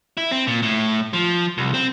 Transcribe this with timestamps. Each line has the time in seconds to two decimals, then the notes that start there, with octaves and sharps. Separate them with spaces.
0.17 E4
0.31 C4
0.47 A#2
0.62 A2
1.13 F3
1.58 C2
1.74 C4